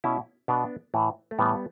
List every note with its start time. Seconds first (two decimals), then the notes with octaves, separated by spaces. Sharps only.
0.04 B2 C#4 E4
0.48 B2 B3 D4
0.94 A2 E3
1.31 A3
1.39 A2 E3 G3 B3